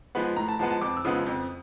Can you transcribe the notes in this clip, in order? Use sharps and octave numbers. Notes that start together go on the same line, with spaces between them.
F3 G#3 B3 B5
A2 A#5
A5
F3 G#3 B3 A5
A5
F2 D6
E6
C#3 F3 G#3 B3 D#6
F2